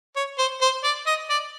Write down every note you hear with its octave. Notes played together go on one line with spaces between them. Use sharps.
C#5
C5
C5
D5
D#5
D5